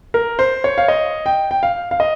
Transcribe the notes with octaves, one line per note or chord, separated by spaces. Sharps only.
A#4
C5
C#5
F5
D#5
G5
G5
F5
F5
D#5